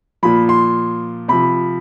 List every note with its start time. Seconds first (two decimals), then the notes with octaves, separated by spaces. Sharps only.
0.23 A#2 F3 B5
0.49 C6
1.28 C3 F3 B5